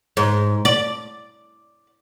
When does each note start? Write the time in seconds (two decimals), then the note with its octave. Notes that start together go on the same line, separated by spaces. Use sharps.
0.17 G#2
0.65 D5